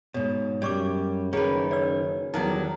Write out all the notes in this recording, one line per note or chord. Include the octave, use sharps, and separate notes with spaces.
G#2 B2 C#5
F#2 G3 D5 C#6 D6
F#1 D#3 C#4 G#4 B4 C#5
C#5 D5 E6
E2 D#3 F#3 G3 D#4